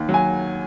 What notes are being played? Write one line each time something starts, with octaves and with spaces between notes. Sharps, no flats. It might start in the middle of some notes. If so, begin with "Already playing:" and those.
Already playing: D#2
F#3
G#5